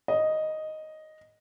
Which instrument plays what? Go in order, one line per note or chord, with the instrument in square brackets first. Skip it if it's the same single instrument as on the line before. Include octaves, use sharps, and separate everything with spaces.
[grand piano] D#5